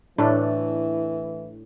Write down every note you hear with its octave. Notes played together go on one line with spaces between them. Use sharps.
A2 E3 A3 D4